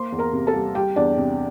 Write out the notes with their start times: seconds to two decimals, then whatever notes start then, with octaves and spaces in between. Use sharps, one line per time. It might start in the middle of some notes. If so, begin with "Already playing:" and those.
Already playing: A#3 C5 C6
0.12 E2
0.19 A#4 A#5
0.33 C3
0.47 A4 A5
0.54 G3
0.75 G3 G4 G5
0.96 E2 D4 D5
1.18 C3